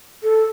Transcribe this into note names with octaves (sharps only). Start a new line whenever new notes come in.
A4